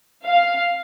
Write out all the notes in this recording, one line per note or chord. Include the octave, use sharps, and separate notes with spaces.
F5